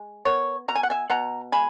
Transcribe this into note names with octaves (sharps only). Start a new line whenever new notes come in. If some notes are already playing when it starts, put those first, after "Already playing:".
Already playing: G#3
B3 A#4 C#5
B2 A#5
G#5
F#5
E5 G#5
B2 F#5 A#5
G#3 G#5 B5